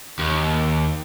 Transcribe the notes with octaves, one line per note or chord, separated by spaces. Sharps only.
D#2